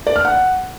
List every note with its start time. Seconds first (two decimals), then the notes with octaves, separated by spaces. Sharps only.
0.07 D5
0.16 F6
0.25 F#5